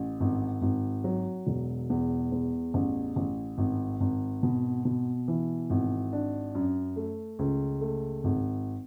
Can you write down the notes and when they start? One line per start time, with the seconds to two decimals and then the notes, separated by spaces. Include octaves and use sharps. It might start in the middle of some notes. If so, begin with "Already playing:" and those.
Already playing: A1
0.20 G#1
0.62 G#1
1.04 F#3
1.47 E1
1.90 E2
2.32 E2
2.74 A1
3.16 A1
3.58 G#1
4.01 G#1
4.43 B2
4.85 B2
5.28 E3
5.70 G#1
6.13 D4
6.55 F#2
6.96 A3
7.39 C#2
7.81 A3
8.24 G#1